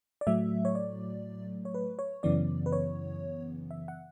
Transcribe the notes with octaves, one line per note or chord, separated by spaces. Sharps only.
D5
A2 F#3 A3 E5
C#5
D5
C#5
B4
C#5
F#2 C#3 E3 B3 D5
B4
C#5
E5
F#5